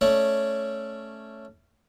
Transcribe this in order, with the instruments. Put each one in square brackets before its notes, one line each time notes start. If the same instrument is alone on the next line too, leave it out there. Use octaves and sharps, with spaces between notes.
[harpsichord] A3 C#4 C#5 D5